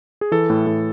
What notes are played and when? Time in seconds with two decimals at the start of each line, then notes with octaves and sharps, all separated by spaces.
0.21 G#4
0.32 E3 A4
0.50 A2
0.67 A2